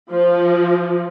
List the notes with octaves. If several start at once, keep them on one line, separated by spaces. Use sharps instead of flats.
F3